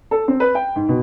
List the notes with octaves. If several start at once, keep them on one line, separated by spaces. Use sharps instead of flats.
A4
C4
B4
G5
G#2
B2